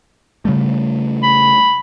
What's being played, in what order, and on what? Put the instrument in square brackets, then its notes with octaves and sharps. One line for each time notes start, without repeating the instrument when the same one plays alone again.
[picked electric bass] C#3 G3 A3
[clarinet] B5